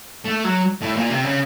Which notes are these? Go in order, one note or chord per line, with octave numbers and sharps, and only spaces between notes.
A3
F#3
A2
A#2
C3
C#3